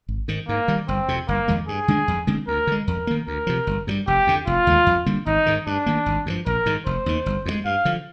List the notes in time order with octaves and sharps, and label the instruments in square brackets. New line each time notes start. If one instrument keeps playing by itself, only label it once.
[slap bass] G#1
G#2 D#3
[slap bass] G#2 [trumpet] A#3
[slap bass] D#3 G3
[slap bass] G1 [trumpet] C4
[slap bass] F2 C3
[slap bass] G1 [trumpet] A#3
[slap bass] F2 D#3 G#3
[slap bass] G2 [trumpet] G#4
[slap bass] D3 G#3 D4
F2
D3 G#3 C4
[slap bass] D2 [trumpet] A#4
[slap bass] D3 G#3
[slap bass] F2 [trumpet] A#4
[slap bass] D#3 A#3
[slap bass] D2 [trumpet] A#4
[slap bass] C3 F3
G1
G2 D#3 G3
[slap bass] F1 [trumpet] G4
[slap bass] F2 D3
[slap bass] F1 [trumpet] F4
[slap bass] D#2 D3 G#3
F2
D3 G3 A#3
[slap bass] G#1 [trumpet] D#4
[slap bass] G#2 D#3
[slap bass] G2 [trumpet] D4
[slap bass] D#3 A#3
G#1
G2 D3 F3
[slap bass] A#1 [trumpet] A#4
[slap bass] G#2 D#3
[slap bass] F1 [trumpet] C5
[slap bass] D#2 D#3
G1
F2 D3 G#3
[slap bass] G2 [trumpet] F5
[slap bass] D3 F3